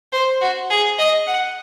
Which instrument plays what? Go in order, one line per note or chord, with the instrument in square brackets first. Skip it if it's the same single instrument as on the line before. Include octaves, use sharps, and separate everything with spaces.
[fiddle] C5
F#4
G#4
D#5
F#5